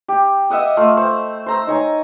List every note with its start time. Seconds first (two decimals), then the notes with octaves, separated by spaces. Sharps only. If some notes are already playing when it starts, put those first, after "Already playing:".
0.08 G4
0.50 D#5 E5 F#5 D#6
0.77 A3 F4 D6
0.97 C5 C#6 E6
1.46 C5 A#5 E6
1.67 D#4 C#5 G#5 A#5